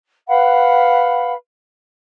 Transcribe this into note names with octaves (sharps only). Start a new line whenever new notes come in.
B4 F5 F#5 B5